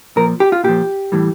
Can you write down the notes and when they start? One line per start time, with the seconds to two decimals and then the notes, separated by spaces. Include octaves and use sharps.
0.16 A#2 F3 A#4
0.40 G4
0.52 F4
0.64 A#2 F3 G4
1.12 A2 E3 G3